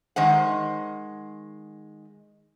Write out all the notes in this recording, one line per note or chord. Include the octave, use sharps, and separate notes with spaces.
D#3 G#3 C5 F#5